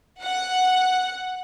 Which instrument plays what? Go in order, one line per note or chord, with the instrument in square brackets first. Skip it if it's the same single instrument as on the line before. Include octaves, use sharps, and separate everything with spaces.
[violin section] F#5